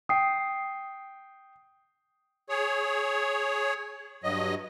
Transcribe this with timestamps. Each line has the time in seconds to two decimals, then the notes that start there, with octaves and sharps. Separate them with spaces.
0.09 G5 D#6 C7
2.49 G#4 C#5
4.24 G2 F#3 D#5